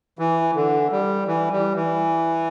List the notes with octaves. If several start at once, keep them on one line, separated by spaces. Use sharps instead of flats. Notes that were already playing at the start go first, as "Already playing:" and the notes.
E3
D3
G3
E3
G3
E3